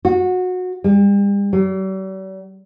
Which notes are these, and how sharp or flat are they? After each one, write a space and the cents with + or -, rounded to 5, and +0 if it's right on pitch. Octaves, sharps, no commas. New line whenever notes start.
F#4 -20
G3 +40
G3 -45